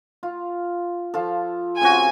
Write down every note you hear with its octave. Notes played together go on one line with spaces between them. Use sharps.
F4
F3 F4 A4
C#3 C4 F#4 G#5